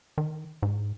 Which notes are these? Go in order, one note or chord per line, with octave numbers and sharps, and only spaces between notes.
D#3
G#2